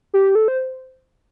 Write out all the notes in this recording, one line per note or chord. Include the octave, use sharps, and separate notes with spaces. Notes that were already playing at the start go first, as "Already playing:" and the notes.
G4
A4
C5